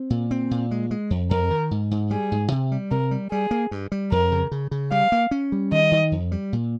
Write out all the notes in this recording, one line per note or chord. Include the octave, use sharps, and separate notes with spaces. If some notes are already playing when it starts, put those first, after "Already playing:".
Already playing: C4
A#2
C4
A#2
G#3
G#3
F2
F2 A#4
D#3
G#2
G#2
G3 G#4
G#2
C3
G3
C3 A#4
G3
G3 G#4
A#3
G2
G3
F2 A#4
C#3
C#3
C#3
G3 F5
A#3
C#4
G3
D#3 D#5
D#3
F2
G3
A#2